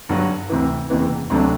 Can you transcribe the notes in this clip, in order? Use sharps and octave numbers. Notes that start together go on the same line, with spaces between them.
G2 D3 F#3
D2 C3 E3
F#1 E2 C3 E3
D2 C3 F#3 A3 D4